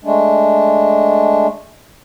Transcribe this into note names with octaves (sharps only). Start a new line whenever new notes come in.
G#3 A3 D4